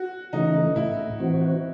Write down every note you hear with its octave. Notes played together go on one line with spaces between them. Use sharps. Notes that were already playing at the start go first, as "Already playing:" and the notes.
Already playing: F#4
C#3 E3 A3 D#4
A2 E4
E3 C4 F#4